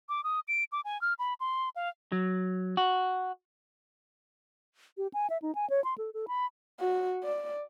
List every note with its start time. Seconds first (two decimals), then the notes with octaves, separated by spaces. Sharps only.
0.09 D6
0.24 D#6
0.48 D7
0.72 D6
0.85 G#5
1.01 F6
1.19 B5
1.40 C6
1.76 F5
2.12 F#3
2.77 F#4
4.97 G4
5.14 G#5
5.30 E5
5.42 D#4
5.55 G#5
5.70 C#5
5.84 C6
5.98 A4
6.14 A4
6.28 B5
6.80 F#4
7.24 D5